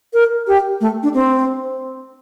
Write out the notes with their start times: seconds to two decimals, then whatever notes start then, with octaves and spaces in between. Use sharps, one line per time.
0.14 A#4
0.47 G4
0.81 A3
1.03 D4
1.14 C4